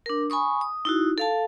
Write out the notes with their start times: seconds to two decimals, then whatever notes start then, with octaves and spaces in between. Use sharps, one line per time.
0.06 D4 A#4
0.30 G#5 B5 C#6 D#6
0.61 D#6
0.85 D#4 E4 F#4
1.18 A4 F5 A5